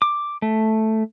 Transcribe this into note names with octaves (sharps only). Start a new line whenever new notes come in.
D6
A3